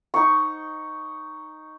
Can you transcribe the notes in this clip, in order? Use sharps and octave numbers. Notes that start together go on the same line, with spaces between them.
D#4 C#6